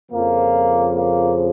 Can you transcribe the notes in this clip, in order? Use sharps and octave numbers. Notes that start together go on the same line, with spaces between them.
F2 C#3 F3 A#3
A#3